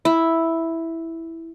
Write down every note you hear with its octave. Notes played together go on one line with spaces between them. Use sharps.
E4